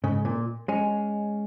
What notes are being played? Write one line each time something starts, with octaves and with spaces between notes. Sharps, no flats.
G#2 C#3
A#2
G#3 C#4